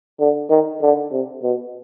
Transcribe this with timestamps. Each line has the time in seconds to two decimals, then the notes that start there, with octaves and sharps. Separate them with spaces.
0.20 D3
0.50 D#3
0.82 D3
1.12 C3
1.43 B2